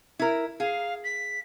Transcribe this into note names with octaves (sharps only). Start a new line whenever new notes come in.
E4 A#4
G#4 F5
B6